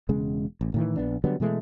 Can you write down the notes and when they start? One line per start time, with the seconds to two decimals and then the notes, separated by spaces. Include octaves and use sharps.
0.09 E1 C#3 G#3
0.61 A1
0.74 A2 D#3 E3
0.96 A#1 B3 D4
1.24 D3 F#3 G3 B3
1.40 B2 E3 G#3 A3